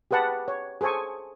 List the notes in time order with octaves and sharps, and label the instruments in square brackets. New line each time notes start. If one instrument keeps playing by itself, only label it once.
[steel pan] G4 G#4 B4 F#5 A5
C#5
G#4 A4 C5 G#5 C#6